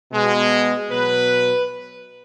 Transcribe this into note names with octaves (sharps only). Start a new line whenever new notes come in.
B2 G#3
B2 F#3 B4